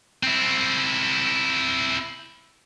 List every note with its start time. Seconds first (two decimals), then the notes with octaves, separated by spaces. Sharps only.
0.23 C4 E4